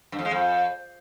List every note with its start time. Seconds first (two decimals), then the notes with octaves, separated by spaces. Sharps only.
0.12 G2
0.19 F2
0.25 G#3
0.31 F2